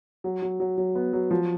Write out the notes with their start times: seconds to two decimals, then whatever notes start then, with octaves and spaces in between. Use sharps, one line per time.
0.24 F#3
0.42 F#3
0.60 F#3
0.78 F#3
0.95 B3
1.13 F#3
1.31 F3